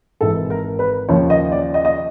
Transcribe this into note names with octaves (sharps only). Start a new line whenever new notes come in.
G#1 G#2 E3 A4
A#4
B4
D#2 C#3 F3 C#5
D#5
D5
D#5
D#5